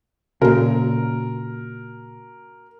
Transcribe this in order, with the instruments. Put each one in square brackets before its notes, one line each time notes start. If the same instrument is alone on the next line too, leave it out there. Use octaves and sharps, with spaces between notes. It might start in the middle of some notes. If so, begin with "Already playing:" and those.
[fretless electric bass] A#2 C#3 [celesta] F#4 [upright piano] A#4